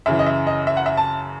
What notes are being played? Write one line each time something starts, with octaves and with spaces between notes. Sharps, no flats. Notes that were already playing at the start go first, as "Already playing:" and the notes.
F#2 C#3 E3 E5
D#5
E5
D#5
E5
F#5
E5
A5